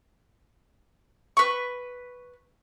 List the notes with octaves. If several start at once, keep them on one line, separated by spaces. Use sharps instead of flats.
B4 C#6